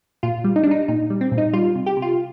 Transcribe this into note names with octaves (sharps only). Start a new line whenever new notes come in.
A#2 F4
G3
D#4
D4
G3 D#4
A#2 D#4
G3
C4
A#2
D#4
G3 F4
C3
G4
C3
F4